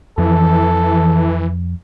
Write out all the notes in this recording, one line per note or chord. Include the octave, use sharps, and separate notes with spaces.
F2 E3 F3 A4